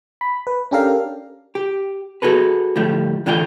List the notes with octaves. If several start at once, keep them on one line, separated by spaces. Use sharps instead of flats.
B5
B4
C#4 D4 G4 A4 A#4 F5
G4
B3 F#4 G#4 A4 B4
A2 D3 F3 G3 A3
A2 D3 E3 A3 F4 G5